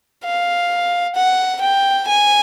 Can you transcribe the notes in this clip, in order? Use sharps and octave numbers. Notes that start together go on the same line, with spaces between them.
F5
F#5
G5
G#5